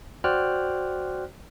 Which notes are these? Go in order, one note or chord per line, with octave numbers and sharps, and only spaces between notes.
F#4 C5 D5 G5 F6 F#6